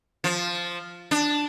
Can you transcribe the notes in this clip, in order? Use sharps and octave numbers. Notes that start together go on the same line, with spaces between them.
F3
D4